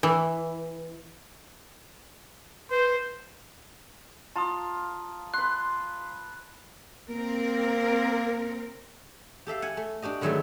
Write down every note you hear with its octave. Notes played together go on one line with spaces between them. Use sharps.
E3
B4 C5
F4 A5 A#5 D#6
B4 C6 F#6
A#3 C4 A#4
G4 A4 E5 F5
F#5 G#5
A3
D4 F#4 G4 D#5
D3 D#3 F#3 G#3 A3 B3